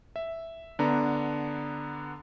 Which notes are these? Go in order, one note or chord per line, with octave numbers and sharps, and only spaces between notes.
E5
D3 B3 D4 A#5